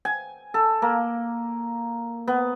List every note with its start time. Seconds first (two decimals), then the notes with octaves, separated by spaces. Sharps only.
0.05 G#5
0.54 A4
0.82 A#3
2.27 B3